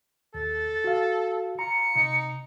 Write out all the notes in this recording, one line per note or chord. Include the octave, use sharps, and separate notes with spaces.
D#2 A4 A6
F#4 F5
F4 A#5 C#7
C3 D#4